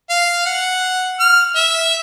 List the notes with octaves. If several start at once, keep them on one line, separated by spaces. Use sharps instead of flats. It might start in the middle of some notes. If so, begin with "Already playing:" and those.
F5
F#5
F6
E5